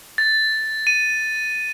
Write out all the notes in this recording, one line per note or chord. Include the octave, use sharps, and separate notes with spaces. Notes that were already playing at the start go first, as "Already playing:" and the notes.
A6
D#7